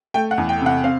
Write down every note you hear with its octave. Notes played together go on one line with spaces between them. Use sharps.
A3 G5
F#5
E2
G5
C3 F#5
C4 F5